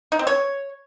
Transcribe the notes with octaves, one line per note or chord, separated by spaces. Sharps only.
D#4
C4
C#5